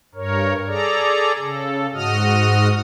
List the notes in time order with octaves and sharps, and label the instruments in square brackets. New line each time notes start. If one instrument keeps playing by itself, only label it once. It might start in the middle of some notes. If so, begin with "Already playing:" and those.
[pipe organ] G2 A#4 C#5
G#4 A4 D5 A#5
C#3 A4
G#2 F#4 D#5 D#6 F6